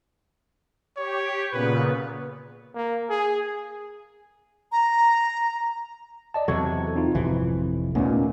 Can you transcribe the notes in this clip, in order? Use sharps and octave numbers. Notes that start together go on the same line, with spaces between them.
G4 C#5
A#2 C#3 B3 B4
A#3
G#4
A#5
D5 D#5 A5
E2 C3 F#3 A4 C#6 G#6
C4 D#4 F4
G#1 F2 C3 E3
D#2 A#2 A3 B3 C#4